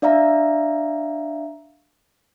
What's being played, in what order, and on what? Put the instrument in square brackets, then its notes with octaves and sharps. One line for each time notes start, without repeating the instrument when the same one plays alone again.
[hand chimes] D4 D5 E5 F5 A#5